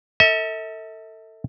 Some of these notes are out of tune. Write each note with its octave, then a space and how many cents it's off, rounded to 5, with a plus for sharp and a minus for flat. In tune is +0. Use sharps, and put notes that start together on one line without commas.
A4 +30 E5 -40